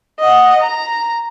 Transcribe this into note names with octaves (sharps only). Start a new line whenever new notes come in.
D#5 F#5
A#5